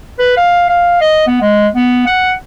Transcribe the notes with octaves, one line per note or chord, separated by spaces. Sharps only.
B4
F5
F5
D#5
B3
G#3
B3
F#5